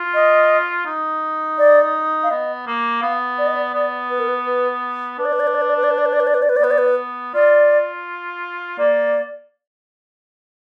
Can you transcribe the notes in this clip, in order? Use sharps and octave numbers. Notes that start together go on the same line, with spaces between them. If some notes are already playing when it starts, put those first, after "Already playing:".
Already playing: F4
D#5
D#4
D5
F5
B3 D#5
A#3
B3 F5
D5
D#5
D5
B3 D5
B4
A#4
B4
B4
D4 B4
D5
B4
D5
B4
D5
B4
D5
B4
D5
B4
D5
B4
D5
B4
D5
B4
D5
B4
D5
B3 B4
D5
B4
F4 D5
A#3 D5